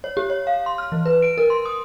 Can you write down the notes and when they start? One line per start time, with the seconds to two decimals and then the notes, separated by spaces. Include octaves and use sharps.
0.04 C#5
0.17 G4
0.30 C#5
0.47 F5
0.66 C6
0.78 F6
0.92 E3
1.06 B4
1.22 D7
1.38 A#4
1.50 C6
1.65 D#6